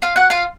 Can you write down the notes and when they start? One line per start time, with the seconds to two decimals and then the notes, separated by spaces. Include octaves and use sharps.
0.02 F4 F5
0.16 F#4 F#5
0.30 F4 F5